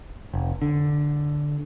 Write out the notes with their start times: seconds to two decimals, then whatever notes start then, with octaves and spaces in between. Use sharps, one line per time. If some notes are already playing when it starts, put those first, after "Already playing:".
0.34 F1
0.62 D3